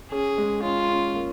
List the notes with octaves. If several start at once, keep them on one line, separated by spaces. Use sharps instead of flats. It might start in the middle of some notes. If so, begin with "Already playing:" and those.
C#4 G#4
G#3
C#4 F4
C#4
A#3